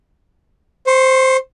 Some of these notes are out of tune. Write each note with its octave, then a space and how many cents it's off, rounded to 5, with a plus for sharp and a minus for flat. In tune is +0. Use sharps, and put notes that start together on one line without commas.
C5 +0 C#6 -40